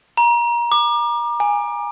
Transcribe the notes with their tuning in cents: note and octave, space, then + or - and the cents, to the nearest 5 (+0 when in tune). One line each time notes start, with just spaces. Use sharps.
A#5 +30
D6 +30
G#5 -10